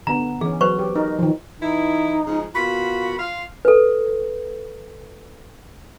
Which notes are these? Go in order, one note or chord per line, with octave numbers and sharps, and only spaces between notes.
D3 B3 A#5
E3 C#4 G#4
F#3 B4 C5 C#6
G4
D#4 A#4
D#3 F3
E3 D#4 E4
C#3 F3 G#3
B2 A#3 F4 F#4 B5
F4 F5
A4 B4